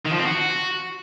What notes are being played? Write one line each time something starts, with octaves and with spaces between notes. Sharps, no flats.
D#3
F3
C4
F#4